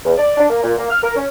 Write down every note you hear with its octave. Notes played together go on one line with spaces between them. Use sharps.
E2
D5
D4
A#3
A#2
A#3
F6
A#4
C#4